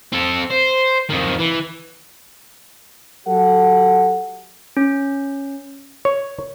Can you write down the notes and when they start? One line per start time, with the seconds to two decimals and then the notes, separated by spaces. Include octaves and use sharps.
0.13 C4 A4
0.51 C5
1.10 F2 D#3
1.39 E3
3.27 F#3 G4 A4 F#5
4.77 C#4
6.05 C#5